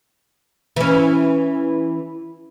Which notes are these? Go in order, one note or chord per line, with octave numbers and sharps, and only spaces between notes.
E3 C#4